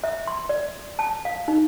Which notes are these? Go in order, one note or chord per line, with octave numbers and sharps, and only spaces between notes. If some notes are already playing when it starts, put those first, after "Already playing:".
E5
C6
D5
A5
F5
D#4